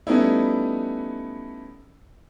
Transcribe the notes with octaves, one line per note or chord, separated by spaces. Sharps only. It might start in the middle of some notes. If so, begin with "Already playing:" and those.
G3 A3 B3 C#4 D#4 E4